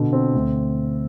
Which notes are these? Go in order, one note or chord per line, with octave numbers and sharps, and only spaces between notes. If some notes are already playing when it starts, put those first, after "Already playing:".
Already playing: B2 D3
C4
D2